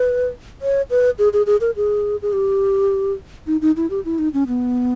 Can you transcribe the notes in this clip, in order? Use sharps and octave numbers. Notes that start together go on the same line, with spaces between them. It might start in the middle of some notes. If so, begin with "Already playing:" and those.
Already playing: B4
C#5
B4
G#4
G#4
G#4
A#4
G#4
G#4
G4
D#4
D#4
E4
G4
E4
D#4
C#4
B3